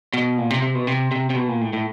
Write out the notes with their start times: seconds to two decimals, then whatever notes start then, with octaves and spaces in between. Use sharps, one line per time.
0.14 B2
0.38 A#2
0.50 C3
0.62 C3
0.75 B2
0.87 C3
1.11 C3
1.30 C3
1.36 B2
1.48 A#2
1.61 A2
1.73 A2